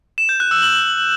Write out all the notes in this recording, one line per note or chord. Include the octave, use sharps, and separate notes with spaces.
E7
G6
F#6
E6
F#7